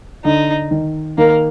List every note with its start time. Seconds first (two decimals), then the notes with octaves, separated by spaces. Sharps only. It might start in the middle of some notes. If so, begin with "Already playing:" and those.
0.25 D3 D#4
0.71 D#3
1.18 D#3 A#3